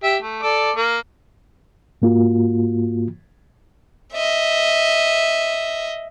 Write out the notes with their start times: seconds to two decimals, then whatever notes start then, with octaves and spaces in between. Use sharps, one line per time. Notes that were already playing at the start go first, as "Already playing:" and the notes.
0.03 G4 E5
0.22 A3
0.43 A4 D5 D6
0.76 A#3
2.02 G#2 A#3 F4 F#4
4.13 D#5 E5